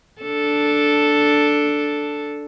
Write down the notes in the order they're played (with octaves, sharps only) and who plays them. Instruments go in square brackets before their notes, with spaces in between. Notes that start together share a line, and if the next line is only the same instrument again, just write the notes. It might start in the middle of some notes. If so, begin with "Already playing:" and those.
[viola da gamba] D4 A4